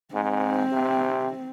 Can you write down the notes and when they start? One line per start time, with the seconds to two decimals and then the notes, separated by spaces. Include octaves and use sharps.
0.14 G#2 C4
0.72 C3